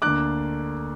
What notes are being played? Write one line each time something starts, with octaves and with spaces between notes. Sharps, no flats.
D2 D3 A#3 D4 D6 F#6